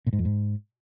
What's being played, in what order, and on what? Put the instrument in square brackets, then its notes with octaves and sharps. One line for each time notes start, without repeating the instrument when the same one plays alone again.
[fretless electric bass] A#2
G#2
F2
G#2